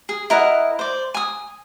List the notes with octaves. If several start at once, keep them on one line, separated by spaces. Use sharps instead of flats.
G#4
E4 A#4 D#5 F#5
C5 D5
G#5 D#6